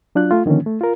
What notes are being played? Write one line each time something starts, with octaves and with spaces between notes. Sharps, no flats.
F#3 D4 F4 F#6
A3 F4
D3 D#3 F3 A#3 C#4
A3
F4 A#4